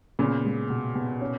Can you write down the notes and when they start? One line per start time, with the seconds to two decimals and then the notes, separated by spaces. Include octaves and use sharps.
0.19 A#2 C#3 B3
0.45 G#3
0.70 B2
0.95 B2
1.21 C#4